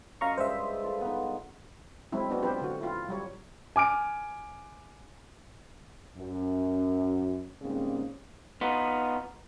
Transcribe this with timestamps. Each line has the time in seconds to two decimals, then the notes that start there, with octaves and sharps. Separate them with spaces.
0.21 F#2 F4 D#5 F5 A#5 C#6
0.38 G2 G#3 C5 E5
0.84 F4 A4
1.01 B3 D#4
2.12 F#3 G#3 C4 E4
2.30 B3 D4 F#4
2.43 F#3 C4 F4 G4 B4 C5
2.61 D3 F#4
2.81 E4 F4
3.08 F#3 G3 C#5
3.76 G#5 D6 F6 D7
6.18 F#2
7.62 G#2 C#3 G3 A#3 C4
8.61 B3 D#4 F4